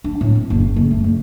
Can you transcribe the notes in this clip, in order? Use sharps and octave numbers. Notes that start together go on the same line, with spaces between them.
D4
A2
C4
F#1
F#1
A3
F#1